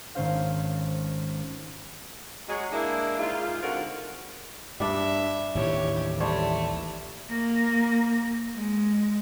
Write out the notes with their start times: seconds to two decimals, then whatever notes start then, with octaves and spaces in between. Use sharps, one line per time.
0.15 G#1 C#4 C5 F5
2.48 F#3 G#3
2.71 G#3 A#3 D4 E4
3.18 G#2 F4
3.62 G#2 D3 C4 F4 F#4 A#4
4.80 G2 G3 D4 E5
5.55 A1 D#2 E3 G4 C#5
6.20 G3 A3 C5 C#5
7.28 A#3
8.53 G#3